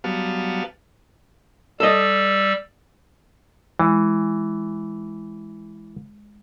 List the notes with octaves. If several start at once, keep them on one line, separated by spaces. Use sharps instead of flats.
F#3 G3 B3 F5 A5
G3 A4 D#5 E6
E3 G#3